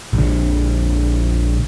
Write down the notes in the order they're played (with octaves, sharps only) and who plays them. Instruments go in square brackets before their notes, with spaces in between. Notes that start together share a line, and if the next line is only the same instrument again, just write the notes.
[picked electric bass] A#1 D3